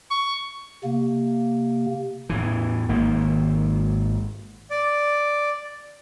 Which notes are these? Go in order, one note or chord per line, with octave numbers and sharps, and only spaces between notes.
C#6
C3 A#3
E2 A2 E3
G#1 D#3 A#3
D5